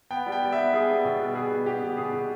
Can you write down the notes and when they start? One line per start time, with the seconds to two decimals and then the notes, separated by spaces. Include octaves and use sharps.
0.11 B3 G5
0.26 G3
0.32 G5
0.42 G3
0.52 E5
0.57 B3
0.73 G3 G#4
0.88 B3
1.05 B2
1.20 G3
1.35 B2 G#4
1.50 B3
1.66 B3 G4
1.83 B2
1.97 B2 G#4
2.13 B2